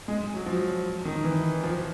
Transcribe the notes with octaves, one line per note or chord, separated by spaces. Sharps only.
G#3
F#3
F3
D#3
E3
F3